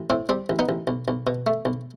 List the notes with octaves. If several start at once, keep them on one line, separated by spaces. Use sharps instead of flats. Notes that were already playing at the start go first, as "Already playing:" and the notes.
Already playing: A1
A2 C4
G3 C4
A1
B3 D#4
A1
B1
B1
B2
A3
B1